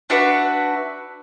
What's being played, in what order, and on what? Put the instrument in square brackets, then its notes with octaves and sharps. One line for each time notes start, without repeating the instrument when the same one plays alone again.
[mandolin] D4 F#4 B4 E5